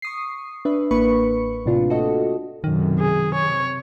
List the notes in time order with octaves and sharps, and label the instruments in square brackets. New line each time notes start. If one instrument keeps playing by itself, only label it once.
[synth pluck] C#6 D#6 C7
D4 B4 E5
A1 A#3 B4 B5 C#6 C#7
A2 C3 D4 F4
F#4 A4 D#5
[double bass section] B1 F#2 C3 [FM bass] D#3
[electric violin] G#4
[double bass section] C3 [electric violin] C#5